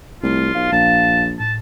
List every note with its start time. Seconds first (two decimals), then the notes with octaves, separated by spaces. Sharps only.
0.23 C2 A3 F4
0.54 B1 F5
0.72 A#1 A5
1.39 A2 A5